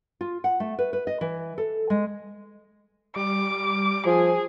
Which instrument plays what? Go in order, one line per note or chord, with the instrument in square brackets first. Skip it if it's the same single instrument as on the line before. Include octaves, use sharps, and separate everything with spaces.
[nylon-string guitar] F4
F#5
A3
B4
B4
D#5
E3
A4
G#3
[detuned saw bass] G3 [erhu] D6
[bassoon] F3 [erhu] G#4